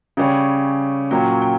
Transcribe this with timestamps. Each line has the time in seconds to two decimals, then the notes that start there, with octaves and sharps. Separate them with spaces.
0.17 C#3 G3 C#4 G5
1.11 A#2 F#3 C#4 G5
1.42 G5